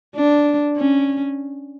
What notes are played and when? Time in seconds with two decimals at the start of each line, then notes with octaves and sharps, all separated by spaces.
0.15 D4
0.77 C#4